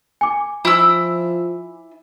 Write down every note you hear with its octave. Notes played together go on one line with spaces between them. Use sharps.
G#5 D6
F3 E4 E6